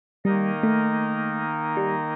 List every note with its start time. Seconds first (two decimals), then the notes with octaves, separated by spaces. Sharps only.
0.25 D#3 G3 A#3 D#4 A#4 D#5
0.63 A3
1.77 G3